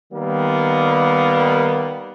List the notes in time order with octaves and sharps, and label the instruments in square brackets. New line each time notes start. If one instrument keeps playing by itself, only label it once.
[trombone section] D#3 G3 A#3 B3